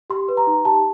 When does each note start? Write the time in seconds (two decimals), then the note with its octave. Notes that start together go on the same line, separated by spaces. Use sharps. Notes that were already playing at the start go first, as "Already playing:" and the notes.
0.10 G4 C6
0.28 B4
0.37 A#5
0.47 D#4
0.65 G4 A5